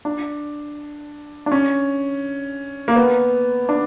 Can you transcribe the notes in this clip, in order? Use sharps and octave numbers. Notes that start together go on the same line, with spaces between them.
D4
D4
C#4
A#3
B3
D4